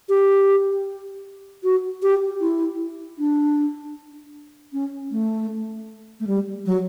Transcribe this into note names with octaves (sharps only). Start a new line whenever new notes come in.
G4
F#4
G4
E4
D4
C#4
A3
A3
G3
F#3